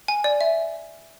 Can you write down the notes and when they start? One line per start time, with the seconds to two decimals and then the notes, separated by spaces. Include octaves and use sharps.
0.08 G#5
0.24 D5
0.41 E5